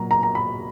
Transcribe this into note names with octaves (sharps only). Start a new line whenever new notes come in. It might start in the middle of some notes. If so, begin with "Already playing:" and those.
Already playing: A#2 F#3 A#5
A#5
A#5
B5